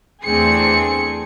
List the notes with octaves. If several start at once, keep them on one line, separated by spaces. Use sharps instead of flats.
E2 A3 C4 D4 G#4 C#7